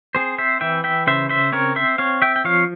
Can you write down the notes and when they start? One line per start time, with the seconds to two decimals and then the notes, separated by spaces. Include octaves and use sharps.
0.15 C4 G#4 C5
0.38 C5 E5
0.61 E3 E5 G5
0.84 E5 G5
1.07 C#3 C5 E5
1.29 C5 E5
1.52 C4 A#4 C#5
1.76 C5 E5
1.98 C4 C#5 F5
2.22 E5 G5
2.36 G5
2.44 F3 C#5 F5